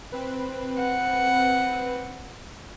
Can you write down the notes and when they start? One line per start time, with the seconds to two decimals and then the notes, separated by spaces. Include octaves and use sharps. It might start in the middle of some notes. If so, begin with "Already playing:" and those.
0.12 C4 B4
0.79 F#5